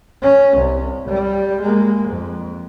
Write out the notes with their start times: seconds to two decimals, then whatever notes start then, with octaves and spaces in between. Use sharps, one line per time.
0.22 C#4
0.57 C2
1.08 G3
1.61 G#3 A#3
2.08 F2